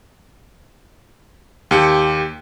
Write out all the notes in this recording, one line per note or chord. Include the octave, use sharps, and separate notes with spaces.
D#2 G4 C#7